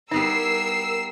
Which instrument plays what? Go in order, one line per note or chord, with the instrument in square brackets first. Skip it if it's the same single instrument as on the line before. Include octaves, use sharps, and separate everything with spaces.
[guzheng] G3 B3 E4 [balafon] D#4 [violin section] A#4 E6 C7